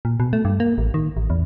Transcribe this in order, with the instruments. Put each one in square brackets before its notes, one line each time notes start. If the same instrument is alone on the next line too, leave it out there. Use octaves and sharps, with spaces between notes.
[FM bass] A#2
B2
A3
G2
A#3
A1
D#3
A1
E2